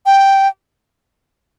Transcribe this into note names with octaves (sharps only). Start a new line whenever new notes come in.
G5